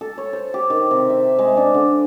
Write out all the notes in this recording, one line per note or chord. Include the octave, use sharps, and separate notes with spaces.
A4
C#5
C5
G4
D#3
C3
E5
G#3
D4
D3